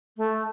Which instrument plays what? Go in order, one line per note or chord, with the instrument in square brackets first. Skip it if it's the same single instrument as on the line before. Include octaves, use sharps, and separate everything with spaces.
[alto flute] A3